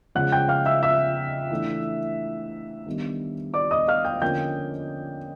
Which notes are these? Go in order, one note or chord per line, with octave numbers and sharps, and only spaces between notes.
C#3 F3 G#3 F#5 F#6
G5 G6
F5 F6
E5 E6
E5 E6
E3 A3 D4
D#3 G3 B3 D4
D5 D6
D#5 D#6
F5 F6
G5 G6
D3 F3 A#3 C#4 G5 G6